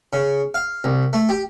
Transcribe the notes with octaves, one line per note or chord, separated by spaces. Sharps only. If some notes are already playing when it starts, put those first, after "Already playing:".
C#3
F5
C2
A3
G4